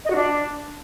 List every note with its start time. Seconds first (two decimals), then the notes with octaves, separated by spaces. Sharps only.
0.05 D#5
0.10 F#4
0.15 D4